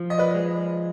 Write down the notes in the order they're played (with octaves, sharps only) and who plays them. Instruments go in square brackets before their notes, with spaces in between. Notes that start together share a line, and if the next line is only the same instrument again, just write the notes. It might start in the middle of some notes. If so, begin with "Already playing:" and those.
Already playing: [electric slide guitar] F3
[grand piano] D#5
B4 D5
[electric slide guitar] G#3